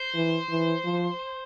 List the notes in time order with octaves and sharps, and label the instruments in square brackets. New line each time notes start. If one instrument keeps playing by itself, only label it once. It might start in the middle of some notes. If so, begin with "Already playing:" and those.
Already playing: [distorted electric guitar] C5
[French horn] E3
E3
F3